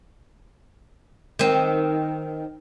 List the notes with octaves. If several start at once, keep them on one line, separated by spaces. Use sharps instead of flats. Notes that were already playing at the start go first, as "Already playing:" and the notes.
D#3 C4